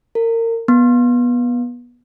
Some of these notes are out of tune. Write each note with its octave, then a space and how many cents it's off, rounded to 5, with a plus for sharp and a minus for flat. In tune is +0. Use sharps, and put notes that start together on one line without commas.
A#4 -30
B3 -20